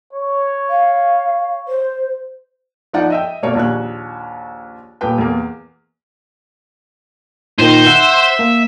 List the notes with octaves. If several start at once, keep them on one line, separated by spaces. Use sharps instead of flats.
C#5
F5
C5
F3 D#4 D5 F#5
D#5 E5 G5
B2 A#3 C#5 D5
A#1 D#2 C#5 F#6
D#1 G4 B4 G5
E2 A#3
A#2 D#3 D#4 C5
E5 F#5
A#3